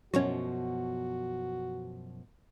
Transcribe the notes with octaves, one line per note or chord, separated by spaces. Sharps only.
F#2 B2 F3 F#3 C#4 F#4